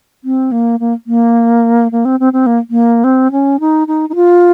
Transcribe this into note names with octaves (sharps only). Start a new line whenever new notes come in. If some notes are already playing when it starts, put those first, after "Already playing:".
C4
A#3
A#3
A#3
A#3
C4
C4
C4
A#3
A#3
C4
C#4
D#4
D#4
D#4
F4